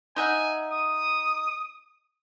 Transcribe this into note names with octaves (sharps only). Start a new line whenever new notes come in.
D#4 E5 F#5 G#5
D#6